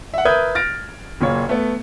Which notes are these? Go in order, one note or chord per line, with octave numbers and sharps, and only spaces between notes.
E5 F#5
A#4 B4 E5 D#6 G6 G#6
F6 A6 A#6 D7
F#1 A#2 F4 C#5
A3 B3